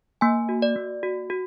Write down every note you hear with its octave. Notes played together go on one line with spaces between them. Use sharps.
A#3 G#5
F#4
D5
A#3
F#4
F#4